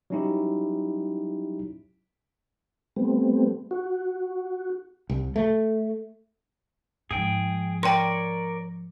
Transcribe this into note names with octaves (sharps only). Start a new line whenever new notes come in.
F#3 G3 C#4 D#4 E4 G4
G3 A3 B3 C4
F#4
C2
A3
G#2 F3 G#4 G5
A#4 C#5 D5 G5 C6